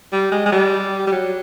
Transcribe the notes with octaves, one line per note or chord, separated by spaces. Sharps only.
G3
G#3
G#3
G3
G3
F#3